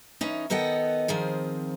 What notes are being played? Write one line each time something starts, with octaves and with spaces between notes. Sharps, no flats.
E3 C#4 D#4
D#3 B3 A4 D#5 F#5 G5
D#3 F3 C4 G#4